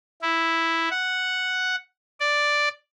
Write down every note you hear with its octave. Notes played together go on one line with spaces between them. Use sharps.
E4
F#5
D5